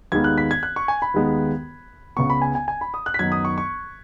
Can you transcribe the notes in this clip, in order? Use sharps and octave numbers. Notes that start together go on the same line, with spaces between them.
D#2 D#3 G#3 B3 G#6
F#6
B6
G#6
F#6
C#6
G#5
B5
D#2 D#3 G#3 B3
C#2 C#3 B3 C#6
B5
G#5
G#5
G#5
B5
D#6
F#6
B6
F#2 D#3 B3 D#4 G#6
D#6
C#6
C#6